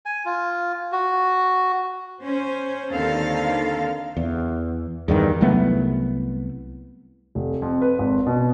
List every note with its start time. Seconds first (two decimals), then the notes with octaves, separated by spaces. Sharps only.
0.06 G#5
0.25 F4
0.92 F#4
2.20 C#4 C5
2.92 D#2 D3 D#3 C4 A4 F5
4.17 E2
5.08 E2 G2 D#3
5.41 C2 F#3 A3 B3
7.35 F1
7.62 F2
7.82 B4
7.99 G#1
8.26 B2